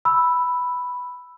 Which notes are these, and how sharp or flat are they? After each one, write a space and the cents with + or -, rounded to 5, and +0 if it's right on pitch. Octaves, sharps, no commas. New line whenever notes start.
B5 +0 E6 +0